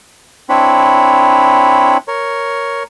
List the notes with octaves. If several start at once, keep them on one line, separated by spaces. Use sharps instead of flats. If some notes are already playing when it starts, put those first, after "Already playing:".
C4 D4 E4 C#5 B5
A#4 C#5